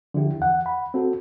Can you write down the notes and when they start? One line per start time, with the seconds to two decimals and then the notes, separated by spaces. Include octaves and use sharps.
0.14 D3 F3 E4 G4
0.39 E2 F#5
0.66 F#5 B5
0.94 C4 F#4 A4